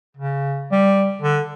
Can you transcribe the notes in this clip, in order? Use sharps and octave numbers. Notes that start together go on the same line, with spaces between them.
C#3
G3
D3